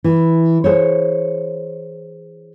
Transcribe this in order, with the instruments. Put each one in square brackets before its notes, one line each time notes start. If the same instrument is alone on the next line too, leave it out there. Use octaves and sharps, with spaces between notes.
[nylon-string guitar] E3
G#4 C5 C#5